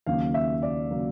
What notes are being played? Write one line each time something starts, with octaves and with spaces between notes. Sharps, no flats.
D#2 C#3 F#3 A#3 F5
E5
D5
C#3 F#3 A#3